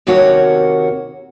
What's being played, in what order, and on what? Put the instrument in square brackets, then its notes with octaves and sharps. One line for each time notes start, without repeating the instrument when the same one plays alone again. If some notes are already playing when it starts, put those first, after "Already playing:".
[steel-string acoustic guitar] D#2 C3 A#3 F#4 C#5